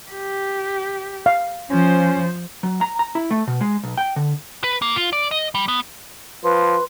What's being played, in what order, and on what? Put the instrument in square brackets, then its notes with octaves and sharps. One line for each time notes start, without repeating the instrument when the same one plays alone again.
[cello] G4
[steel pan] F5
[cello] F3 C5 [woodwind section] C#4
[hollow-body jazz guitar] F#3
A#5
A#5
E4
A3
B2
G#3
B1
G5
D3
[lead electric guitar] B4
A#3
F4
D5
D#5
G3
B3
[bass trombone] F3 [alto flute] B4 [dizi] C6